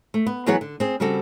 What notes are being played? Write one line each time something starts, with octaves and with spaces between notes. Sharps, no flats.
A3
B3
E3 F#3 B3 G#4 C#5 F#5
D3
C4 G#4
C#3 G3 C4 F#4 A4